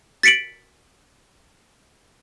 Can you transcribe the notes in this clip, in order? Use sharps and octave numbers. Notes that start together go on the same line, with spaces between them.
A6 B6 C#7 D7 F#7